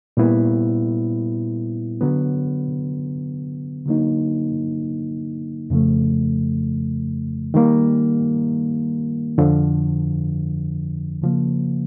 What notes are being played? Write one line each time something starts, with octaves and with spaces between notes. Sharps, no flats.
A#2 G3 B3 E4
D3 F#3 B3
D3 F#3 A#3 D#4
F2 C#3 F3 A3
D#3 G3 A#3
F2 D3 F3
C#3 F3 A#3